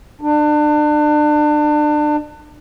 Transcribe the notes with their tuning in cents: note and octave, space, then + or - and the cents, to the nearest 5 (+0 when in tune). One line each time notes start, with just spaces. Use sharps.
D4 +30